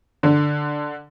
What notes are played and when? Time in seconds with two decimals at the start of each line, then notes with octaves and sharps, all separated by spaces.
0.23 D3